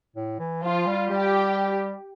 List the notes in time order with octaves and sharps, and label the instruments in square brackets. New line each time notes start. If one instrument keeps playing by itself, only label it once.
[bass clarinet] A2
E3
[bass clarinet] F3 [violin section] F4
[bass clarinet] G3
[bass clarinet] G3 [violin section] G4